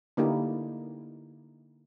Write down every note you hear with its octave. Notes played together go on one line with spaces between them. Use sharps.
D3 A#3 D#4 E4 G4